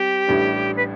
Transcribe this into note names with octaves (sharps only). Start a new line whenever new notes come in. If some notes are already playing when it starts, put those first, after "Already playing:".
Already playing: G3 C4 G4
A1 A2 G3 D4
B4